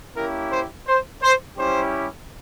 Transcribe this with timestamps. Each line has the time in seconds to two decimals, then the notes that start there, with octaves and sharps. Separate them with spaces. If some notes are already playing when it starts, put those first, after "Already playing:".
0.15 A#3 C#4 E4 G4 A#4
0.51 C5
0.87 C5
1.22 C5
1.57 G3 C#4 E4 G4 C5